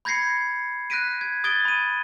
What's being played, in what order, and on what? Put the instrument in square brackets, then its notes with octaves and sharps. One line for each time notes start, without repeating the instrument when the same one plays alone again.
[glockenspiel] B5 G6 G#6 A#6 C7 C#7
F#6 G6 A#6 B6 D7 D#7
G#6
D#6 G#6 A6 D7 G7
B5 D#7